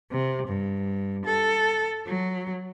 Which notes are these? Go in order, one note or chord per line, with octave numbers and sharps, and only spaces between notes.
C3
G2
A4
F#3